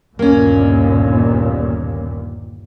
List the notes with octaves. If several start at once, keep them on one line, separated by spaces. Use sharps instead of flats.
G1 D#2 A#2 A#3 C#4